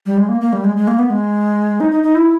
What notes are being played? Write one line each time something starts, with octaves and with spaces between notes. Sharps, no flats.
G3
G#3
A#3
A#3
G3
G#3
G#3
A#3
B3
G#3
D#4
D#4
D#4
E4